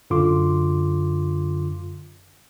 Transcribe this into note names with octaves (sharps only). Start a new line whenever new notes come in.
F#2 D3 F4 C6 D6